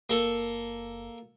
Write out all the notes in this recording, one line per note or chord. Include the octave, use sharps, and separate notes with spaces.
F#1 A#3 A4